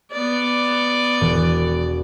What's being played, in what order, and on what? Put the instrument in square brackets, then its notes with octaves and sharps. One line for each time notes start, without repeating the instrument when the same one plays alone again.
[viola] B3 D5
[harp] E1